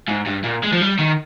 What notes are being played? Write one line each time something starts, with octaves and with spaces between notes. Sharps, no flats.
G#2
G2
A#2
G#3
F3
G3
D#3